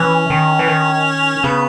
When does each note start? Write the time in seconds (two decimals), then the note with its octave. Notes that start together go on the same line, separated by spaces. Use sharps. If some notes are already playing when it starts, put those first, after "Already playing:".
Already playing: E3 C#4
0.30 D#3
0.59 E3
0.68 D#3
1.44 C#3 B3